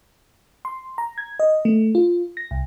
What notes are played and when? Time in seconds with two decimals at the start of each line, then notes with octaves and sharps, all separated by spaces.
0.65 C6
0.98 A#5
1.18 G#6
1.40 D#5
1.65 A3
1.95 F4
2.37 A#6
2.51 C2